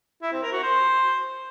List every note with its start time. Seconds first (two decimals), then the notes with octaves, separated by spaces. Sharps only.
0.22 E4
0.32 C4
0.42 A#4
0.53 F#4
0.63 C5